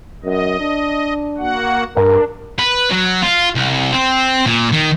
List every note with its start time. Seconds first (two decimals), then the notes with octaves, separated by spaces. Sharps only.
0.24 F#2 D#5
0.60 D4
1.38 A#3 F#4 F#5
1.97 G2 D4 A#4
2.59 B4
2.91 F#3
3.23 F4
3.55 C2
3.92 C4
4.46 A#2
4.72 D#3